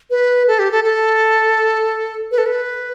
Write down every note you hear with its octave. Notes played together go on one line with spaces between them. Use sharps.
B4
A4
G4
A4
A4
B4
A4
B4